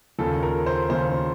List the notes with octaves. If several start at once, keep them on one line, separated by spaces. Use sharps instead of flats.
D#2 C#3 F3 A4
A#4
C5
D#2 C#3 F3 C5